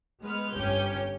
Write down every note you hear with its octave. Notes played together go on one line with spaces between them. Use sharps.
G#3 B3 B4 F6
G1 C#4 G4 G6